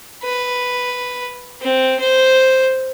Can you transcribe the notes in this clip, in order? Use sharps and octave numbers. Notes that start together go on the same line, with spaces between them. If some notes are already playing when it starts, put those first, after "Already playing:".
B4
C4
C5